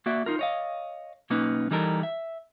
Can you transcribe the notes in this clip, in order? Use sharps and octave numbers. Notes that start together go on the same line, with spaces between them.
A#3 F#4 D5 E5
D#4 F4 A#4
C#5 D#5 F5
B1 A#3 C#4 D#4 B4
E3 G3 D#4 A4 A#4
E5